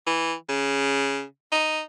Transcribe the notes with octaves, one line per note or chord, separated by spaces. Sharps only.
E3
C#3
D#4